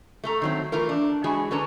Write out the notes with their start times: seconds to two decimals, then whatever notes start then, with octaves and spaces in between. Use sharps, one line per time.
0.24 A3 A4 A#5
0.42 D#3 F#3 C4
0.72 E3 A3 F4 A#4
0.89 D4
1.24 E3 F#3 G#3 E4 F#4 G#4
1.51 D3 C#4 B4 A5 A#5